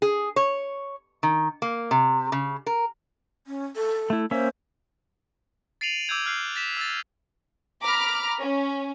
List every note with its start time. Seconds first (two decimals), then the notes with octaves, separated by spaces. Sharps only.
0.02 G#4
0.36 C#5
1.23 D#3
1.62 A#3
1.91 C3
2.32 C#3
2.66 A#4
3.47 C#4
3.76 A4
4.10 A3 E4
4.31 A#3 C#4 C5 E5
5.81 A6 C7 D7 D#7 F7 F#7
6.08 D6 E6 G6 G#6 F7
6.26 F6 F#6 C7
6.56 A6 B6 E7
6.77 E6 A6
7.81 A#5 B5 D6 F6
8.39 C#4